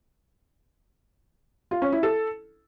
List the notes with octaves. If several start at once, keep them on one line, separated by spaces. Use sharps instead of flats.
F4
C#4
E4
A4